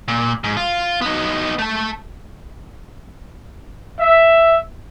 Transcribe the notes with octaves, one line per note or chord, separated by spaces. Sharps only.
A#2
G#2
F4
B3 D#4
A3 A5
E5